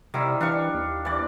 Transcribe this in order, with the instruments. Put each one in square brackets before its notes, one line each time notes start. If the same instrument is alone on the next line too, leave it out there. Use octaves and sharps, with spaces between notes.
[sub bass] C3 [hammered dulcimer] D#3 G3 E4
[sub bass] E3 [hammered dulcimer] D4 F5 C#6
[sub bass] D#2
[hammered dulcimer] E3 D5